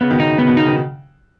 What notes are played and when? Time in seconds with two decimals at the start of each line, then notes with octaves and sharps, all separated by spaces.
0.01 C#3 B3
0.10 B2 D#3
0.20 C#3 D#4
0.30 B2
0.38 C#3 B3
0.48 B2 D#3
0.57 C#3 D#4
0.66 B2 D#3